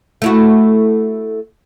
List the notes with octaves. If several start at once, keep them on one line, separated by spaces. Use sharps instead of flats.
A3 E4 F#4